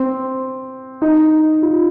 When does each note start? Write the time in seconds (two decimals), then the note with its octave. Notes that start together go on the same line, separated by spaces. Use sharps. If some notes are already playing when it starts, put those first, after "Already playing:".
Already playing: C4
1.02 D#4
1.62 F4